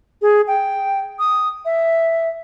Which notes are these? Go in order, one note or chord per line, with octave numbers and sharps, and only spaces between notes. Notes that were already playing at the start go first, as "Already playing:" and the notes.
G#4
G5
D#6
E5